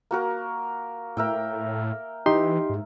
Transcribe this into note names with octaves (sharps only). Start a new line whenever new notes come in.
A#3 F#4 A#4
A2 A#4 E5 G5
E3 D#4 G4 C6
G#2